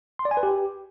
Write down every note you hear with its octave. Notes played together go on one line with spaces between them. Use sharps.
C6
D5
G#5
B4
G4